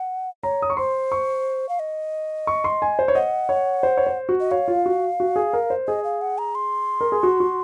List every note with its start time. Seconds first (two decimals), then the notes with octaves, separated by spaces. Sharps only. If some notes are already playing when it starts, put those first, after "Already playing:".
Already playing: F#5
0.43 C#5 A#5
0.62 D#6
0.70 C#6
0.77 C5 C6
1.12 C#6
1.69 F5
1.79 D#5
2.47 C#6
2.64 C6
2.82 G#5
2.99 C5
3.08 C#5
3.15 D#5 F#5
3.49 C#5
3.83 C5
3.97 C#5
4.07 C5
4.29 F#4
4.40 D#5
4.51 C#5 F5
4.68 F4
4.86 F#4
5.20 F#4
5.36 G#4
5.53 A#4
5.70 C5
5.87 G#4 D#5
6.04 F5
6.21 F#5
6.38 A#5
6.55 C6
7.01 A#4
7.12 G#4
7.23 F#4
7.40 F#4